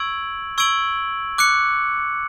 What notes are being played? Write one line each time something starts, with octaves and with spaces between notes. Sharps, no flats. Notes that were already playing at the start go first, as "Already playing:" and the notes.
Already playing: C#6 E6 G#6 D7 F#7
C#6 E6 G#6 D7 F#7
D6 F#6 C#7